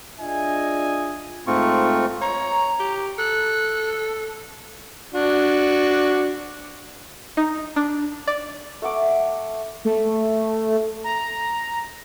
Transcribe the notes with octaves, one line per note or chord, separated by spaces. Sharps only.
D4 F4 G#4 D#5 E5 G#5
G#2 A3 C4 F4 C#6
C#5 A#5
G4
A4 F#6
D4 F#4
D#4
D4
D5
A3 F#5 D6
A3
A#5